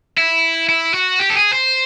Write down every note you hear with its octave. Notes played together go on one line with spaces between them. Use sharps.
E4
E4
F#4
G4
A4
G#4
C5